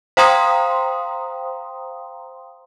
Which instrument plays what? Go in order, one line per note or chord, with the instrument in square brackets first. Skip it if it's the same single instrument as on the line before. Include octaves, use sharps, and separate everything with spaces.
[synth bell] C5 F5 G5 A#5 C6 D#6